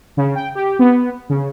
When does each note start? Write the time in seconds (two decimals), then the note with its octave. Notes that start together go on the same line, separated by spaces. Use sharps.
0.17 C#3
0.35 G5
0.55 G4
0.79 B3
1.30 C#3